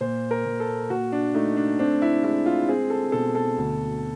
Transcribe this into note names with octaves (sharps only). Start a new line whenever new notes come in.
A#2 C5
A#4
A#2
A4
A#2 F#4
D4
A3 D#4
D4
C4 D4
E4
G#3 E4
F4
C4 G#4
A4
B2 A4
A4
D2